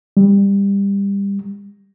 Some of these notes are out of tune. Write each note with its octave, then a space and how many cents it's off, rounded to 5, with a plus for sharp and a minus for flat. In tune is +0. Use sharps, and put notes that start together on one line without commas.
G3 +25